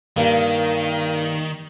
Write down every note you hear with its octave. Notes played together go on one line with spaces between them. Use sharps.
G2 D#3 A#3